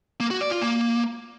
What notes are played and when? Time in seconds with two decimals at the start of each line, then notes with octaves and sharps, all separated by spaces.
0.20 A#3
0.31 F#4
0.41 D5
0.51 F4
0.61 A#3